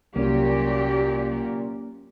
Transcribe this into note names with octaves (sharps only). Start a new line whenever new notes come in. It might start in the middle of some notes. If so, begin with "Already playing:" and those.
C2 A#2 F#3 A#3 C#4 G4 D5